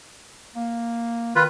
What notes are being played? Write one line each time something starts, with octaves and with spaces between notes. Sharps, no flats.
A#3
D#3 F4 B4